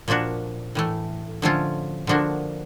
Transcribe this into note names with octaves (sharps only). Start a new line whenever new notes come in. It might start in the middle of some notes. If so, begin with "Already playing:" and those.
A#2 F3 A#3 D4 F#4
A2 E3 A3
D3 F3 A3 C#4 F4
D3 F3 A#3 D4 F#4